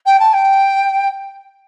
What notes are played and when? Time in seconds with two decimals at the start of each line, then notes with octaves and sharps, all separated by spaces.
0.06 G5
0.19 A5
0.33 G5